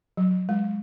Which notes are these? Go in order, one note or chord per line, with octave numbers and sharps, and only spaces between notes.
F#3
G#3